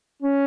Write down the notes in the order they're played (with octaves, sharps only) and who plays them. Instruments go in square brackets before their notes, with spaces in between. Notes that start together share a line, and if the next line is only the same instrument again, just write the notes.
[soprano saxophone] C#4